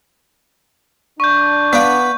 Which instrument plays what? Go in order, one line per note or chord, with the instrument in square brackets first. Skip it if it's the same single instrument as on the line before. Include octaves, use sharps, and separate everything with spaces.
[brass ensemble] D4 [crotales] C#6 G6
[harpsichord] B3 [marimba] D5 F5